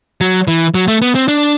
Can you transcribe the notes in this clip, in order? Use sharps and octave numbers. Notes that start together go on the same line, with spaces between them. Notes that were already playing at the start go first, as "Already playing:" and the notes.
F#3
E3
F#3
A3
B3
C4
D4